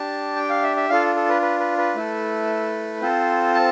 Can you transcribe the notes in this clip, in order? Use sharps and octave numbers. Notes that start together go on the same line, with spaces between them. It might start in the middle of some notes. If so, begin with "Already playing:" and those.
Already playing: D4 G4 A5
G5
F5
E5
E5
D4 F4 A4 F5
A4
B4
B4
B4
B4
A3 E4 A4
C4 F4 A4 C5
A5